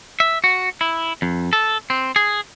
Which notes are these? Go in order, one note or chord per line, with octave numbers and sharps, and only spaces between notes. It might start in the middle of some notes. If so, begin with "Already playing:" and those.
E5
F#4
E4
F2
A4
C4
G#4